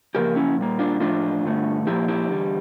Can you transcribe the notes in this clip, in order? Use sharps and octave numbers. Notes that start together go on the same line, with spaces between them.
C#3 F3 A#3 G4 A#4
C#4 E4
A#2 G3 A#3
D4 F4
A2 F3 A3 D4 F4
G2 D3 A3
A#2 F3 A#3 E4 G4
E4 G4
E2 D3 G3